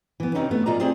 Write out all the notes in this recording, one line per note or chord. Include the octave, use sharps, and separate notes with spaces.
E3 B3
F2 C3 C4 C#4 D#4
A3 B3
B2 G#3 F4 D5 D#5 A#5
A3 C4 G#4 C5 D5